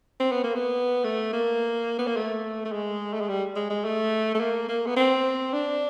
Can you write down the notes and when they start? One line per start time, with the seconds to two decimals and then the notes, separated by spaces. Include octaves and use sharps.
0.20 C4
0.32 B3
0.44 A#3
0.55 B3
1.04 A3
1.33 A#3
1.99 B3
2.07 A#3
2.16 A3
2.65 A3
2.72 G#3
3.14 A3
3.20 G#3
3.29 G3
3.56 G#3
3.70 G#3
3.85 A3
4.35 A3
4.40 A#3
4.68 A#3
4.86 B3
4.96 C4
5.53 D4